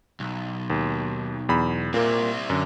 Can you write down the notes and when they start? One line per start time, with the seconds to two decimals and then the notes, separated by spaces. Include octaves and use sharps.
0.20 B1
0.70 D#2
1.49 E2 B5
1.94 A#2 A#3 C4 E4
2.50 F#2 D3